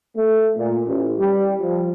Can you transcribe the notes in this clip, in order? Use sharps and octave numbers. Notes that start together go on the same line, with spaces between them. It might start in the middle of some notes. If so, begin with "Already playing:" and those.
A3
A#2
A1
G3
F3